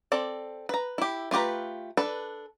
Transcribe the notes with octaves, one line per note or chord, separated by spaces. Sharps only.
C4 A4 D5
B4 A#5
E4 G4
A3 F4 G4 B4 A#5
D4 A4 B4